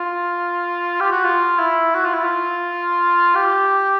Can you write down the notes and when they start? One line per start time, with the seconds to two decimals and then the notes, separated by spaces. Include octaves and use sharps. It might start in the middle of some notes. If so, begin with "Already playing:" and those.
Already playing: F4
1.00 G4
1.12 F#4
1.24 F4
1.59 E4
1.95 F#4
2.04 F4
2.14 E4
2.24 F4
3.35 G4